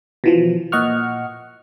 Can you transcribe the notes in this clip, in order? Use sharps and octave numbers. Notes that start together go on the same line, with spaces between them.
B2 E3 F3
A#2 D#5 F#5 C#6 F6